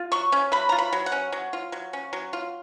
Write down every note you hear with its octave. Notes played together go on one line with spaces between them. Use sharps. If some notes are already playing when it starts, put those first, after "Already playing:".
Already playing: F4
F#3 C#6
C#4
F#3 B5
F4 A#5
B5
F#3
F#5
C#4
F#3
F4
F#3
C#4
F#3
F4